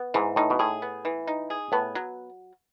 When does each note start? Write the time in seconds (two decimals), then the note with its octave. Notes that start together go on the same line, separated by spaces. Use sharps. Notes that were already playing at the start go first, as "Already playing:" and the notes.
Already playing: B3
0.14 G#2 E3
0.36 A2 D#4
0.50 B2
0.59 A2 G#4
0.82 B3
1.05 E3
1.27 D#4
1.50 G#4
1.72 A2 B3
1.95 F#3